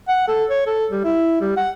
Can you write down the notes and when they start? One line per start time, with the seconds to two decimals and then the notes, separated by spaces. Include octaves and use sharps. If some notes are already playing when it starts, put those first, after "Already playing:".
0.09 F#5
0.28 A4
0.50 C#5
0.67 A4
0.91 G3
1.04 E4
1.41 G3
1.57 F#5